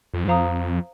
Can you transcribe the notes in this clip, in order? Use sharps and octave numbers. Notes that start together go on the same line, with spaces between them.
F2
G#2
F2 C5 F5 A#5 D#6